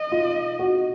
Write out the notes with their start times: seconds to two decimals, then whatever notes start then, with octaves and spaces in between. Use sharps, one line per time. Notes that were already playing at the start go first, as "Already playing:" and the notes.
Already playing: D#5
0.12 F4
0.59 F#4